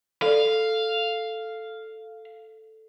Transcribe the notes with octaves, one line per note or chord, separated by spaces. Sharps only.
A4 D5 F5